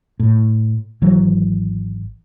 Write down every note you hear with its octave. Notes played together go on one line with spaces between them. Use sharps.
A2
G#1 E3 F#3